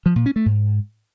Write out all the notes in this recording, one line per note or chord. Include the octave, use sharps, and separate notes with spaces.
F3
A#2
C#4
A3
G#2